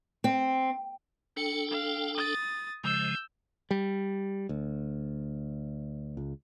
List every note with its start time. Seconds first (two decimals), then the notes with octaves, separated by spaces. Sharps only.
0.24 C4
1.37 D4 A4 G5 C#7
1.70 F5
2.16 D#6 A6
2.84 C#3 F3 G#3 E6 G6
3.71 G3
4.49 D2
6.17 C#2